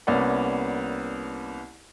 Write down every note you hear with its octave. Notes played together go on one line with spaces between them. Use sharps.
C2 A#3 B3 C#4 D5 F#5